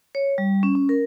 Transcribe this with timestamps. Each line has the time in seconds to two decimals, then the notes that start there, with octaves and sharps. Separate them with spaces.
0.15 C#5
0.38 G3
0.63 C#4
0.75 C#4
0.89 A#4